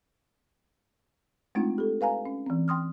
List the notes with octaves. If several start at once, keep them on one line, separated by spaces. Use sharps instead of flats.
G#3 A3 C4 D4 D#4 F4
G4 A4
B4 F5 G#5 A#5
C#4
E3 C4
G5 C6 D#6 F6